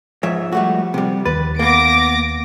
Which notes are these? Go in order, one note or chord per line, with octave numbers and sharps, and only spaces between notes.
G#2 F3 C#5 E5
G3 A3 F#4
C3 G3
D#2 B4 A6
A#3 B3 D6 A#6 D7